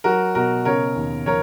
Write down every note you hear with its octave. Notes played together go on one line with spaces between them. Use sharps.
F#3 F#4 A#4
B2 F#4 A#4
C#3 A#4 C#5
D#2
F3 A#4 C#5